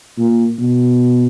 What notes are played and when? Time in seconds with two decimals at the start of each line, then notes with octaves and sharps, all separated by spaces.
0.18 A#2
0.59 B2